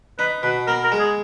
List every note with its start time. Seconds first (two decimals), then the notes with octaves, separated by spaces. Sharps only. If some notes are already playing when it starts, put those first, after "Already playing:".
0.19 D#4 B4
0.43 B2 B4
0.67 B3 A#4
0.84 A#4
0.92 G#3
1.00 G#4